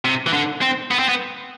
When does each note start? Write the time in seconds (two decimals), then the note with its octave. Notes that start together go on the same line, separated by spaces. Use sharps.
0.05 C3
0.27 E3
0.33 D3
0.62 C4
0.91 B3
0.99 C4
1.09 B3